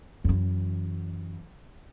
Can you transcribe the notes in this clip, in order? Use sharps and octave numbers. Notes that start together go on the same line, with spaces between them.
F#2 E3